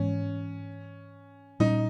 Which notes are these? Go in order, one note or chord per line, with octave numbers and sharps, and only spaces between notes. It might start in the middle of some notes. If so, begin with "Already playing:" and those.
Already playing: G#2 E3 G#3 B3 C#4
A#2 G3 C#4 D#4